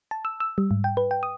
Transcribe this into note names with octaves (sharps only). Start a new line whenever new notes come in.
A5
E6
E6
G3
G#2
G5
B4
G5
D#6